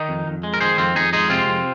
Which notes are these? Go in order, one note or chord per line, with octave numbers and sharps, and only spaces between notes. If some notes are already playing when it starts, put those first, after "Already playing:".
Already playing: D#3 D#4
F2
F2
G#3
A#4
D#3 G#4 C5
F2 C4 F4
F2 D#4 G#4
G#3 D#4 G#4
C3 C4 F4
F2